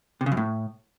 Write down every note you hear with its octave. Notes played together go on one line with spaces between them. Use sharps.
C3
C#3
F#2
A2